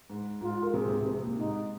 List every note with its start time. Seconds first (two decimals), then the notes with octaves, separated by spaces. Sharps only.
0.10 G#2
0.41 G#2 F4
0.63 A#4
0.74 C3 G#4
0.90 C3
1.06 C3
1.21 A#2
1.38 G#2 D#4